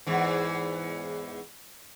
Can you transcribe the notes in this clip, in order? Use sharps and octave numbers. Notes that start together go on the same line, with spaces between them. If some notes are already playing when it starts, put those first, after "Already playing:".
E2 G#2 E3